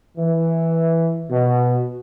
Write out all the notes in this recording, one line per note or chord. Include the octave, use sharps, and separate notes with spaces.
E3
B2